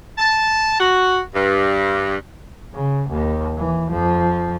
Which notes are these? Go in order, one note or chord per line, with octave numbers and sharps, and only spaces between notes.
A5
F#4
G2
C#3
D#2
E3
F2 F3